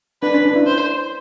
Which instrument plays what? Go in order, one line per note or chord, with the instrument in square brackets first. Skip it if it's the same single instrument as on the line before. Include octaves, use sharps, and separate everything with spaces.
[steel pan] D4 [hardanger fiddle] B4
[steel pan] C#4
D4
E4
[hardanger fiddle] C5